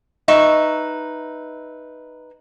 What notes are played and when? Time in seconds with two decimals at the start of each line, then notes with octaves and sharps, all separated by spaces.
0.28 D#4 B4 E5 C#6